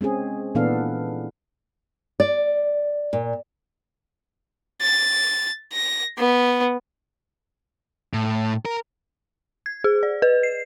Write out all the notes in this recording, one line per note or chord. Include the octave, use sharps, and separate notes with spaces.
G#3 C4 C#4 G#4
A#2 E3 B3 D4 A4 F5
D5
A#2
A6
A#6
B3
A2
A#4
G#6
G#4
D5
B4
C7